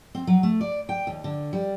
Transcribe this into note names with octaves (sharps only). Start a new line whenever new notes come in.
C4
F#3
A3
D5
G5
D#2
D3
G3